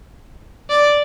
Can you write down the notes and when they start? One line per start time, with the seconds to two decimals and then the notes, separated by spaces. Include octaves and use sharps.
0.70 D5